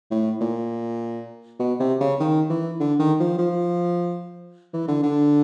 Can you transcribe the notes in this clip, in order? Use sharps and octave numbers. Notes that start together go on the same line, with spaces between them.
A2
A#2
B2
C3
C#3
D#3
E3
D3
D#3
F3
F3
E3
D3
D3